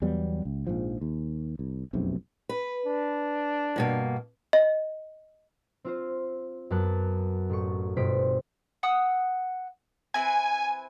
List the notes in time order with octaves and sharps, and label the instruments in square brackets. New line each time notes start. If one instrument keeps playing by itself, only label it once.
[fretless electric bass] E2 F#3 G3 B3
C#2
A#1 G#2 F3
D#2
C2
F1 B1 F#2 C3
[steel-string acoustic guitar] B4
[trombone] D4
[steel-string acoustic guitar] G2 B2 A#3
[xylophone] D#5
[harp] C4 F4 C5
F#2 B3 A5 F#6 C#7
A1 A3 C#6
G1 B2 C5 B6 D7
[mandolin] F#5 D#6 E6
[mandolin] C4 E4 B4 [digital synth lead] G#5